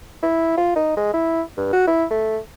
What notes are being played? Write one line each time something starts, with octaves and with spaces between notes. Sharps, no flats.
E4
F4
D#4
G#3
E4
G2
F#4
E4
A3